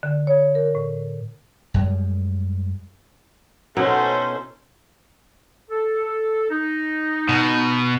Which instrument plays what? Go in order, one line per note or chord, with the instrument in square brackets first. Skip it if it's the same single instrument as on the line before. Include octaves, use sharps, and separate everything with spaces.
[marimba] D3
C#5
A#4
A2
[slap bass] F#2 G3 G#3
[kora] B2 D#4 E4 [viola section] C#4 A4 C5
[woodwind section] A4
D#4
[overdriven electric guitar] B2